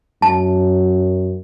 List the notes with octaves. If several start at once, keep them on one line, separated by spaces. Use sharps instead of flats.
F#2 A5